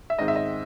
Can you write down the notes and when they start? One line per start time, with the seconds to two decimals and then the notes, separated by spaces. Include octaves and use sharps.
0.10 E5
0.19 G#2 D#3 G#3 C4 D#5
0.28 E5
0.36 D#5